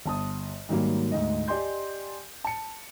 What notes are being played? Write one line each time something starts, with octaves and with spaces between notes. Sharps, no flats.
G1 A5 D#6
G#2 D#3 F#3 G3 A#3
D2 G#2 D#5
G4 D5 D#5 G#5 C6 G6
A5 C#7